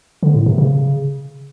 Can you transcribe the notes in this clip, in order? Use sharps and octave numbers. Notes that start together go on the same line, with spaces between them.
D3
A2
C3
C#3